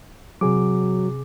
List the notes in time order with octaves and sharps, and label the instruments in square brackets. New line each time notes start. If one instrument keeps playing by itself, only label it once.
[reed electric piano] C3 G#4 D6 [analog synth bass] F#3